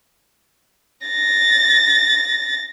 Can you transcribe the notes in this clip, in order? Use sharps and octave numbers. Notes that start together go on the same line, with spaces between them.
A6 A#6